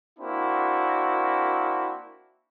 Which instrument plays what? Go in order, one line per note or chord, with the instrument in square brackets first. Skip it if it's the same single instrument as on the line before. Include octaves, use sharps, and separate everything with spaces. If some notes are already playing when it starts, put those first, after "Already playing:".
[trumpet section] A#3 C4 D4 E4 F#4